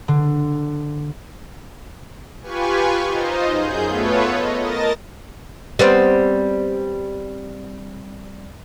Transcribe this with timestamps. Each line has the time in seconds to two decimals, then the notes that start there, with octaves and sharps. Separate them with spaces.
0.08 D3
2.42 F4 G4 B4 G#5 C#6
3.06 D#4 F4 C5 D#5
3.50 F#2 G#4 G6
3.87 A3 B3 F4 A4 B4 C#5
4.29 D#5
4.60 A#4 D#5 A5 A6 A#6
5.79 G3 B3 C4